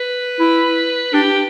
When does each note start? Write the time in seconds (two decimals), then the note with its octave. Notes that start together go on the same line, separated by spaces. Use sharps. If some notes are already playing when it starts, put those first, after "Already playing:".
Already playing: B4
0.40 E4
1.14 D4 G4